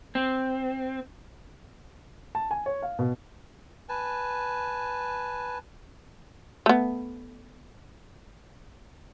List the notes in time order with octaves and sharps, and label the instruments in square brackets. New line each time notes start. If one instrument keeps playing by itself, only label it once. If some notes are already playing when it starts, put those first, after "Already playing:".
[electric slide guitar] C4
[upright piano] A5
G#5
C#5
F5
B2
[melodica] B4 G#5 A5
[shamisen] A3 B3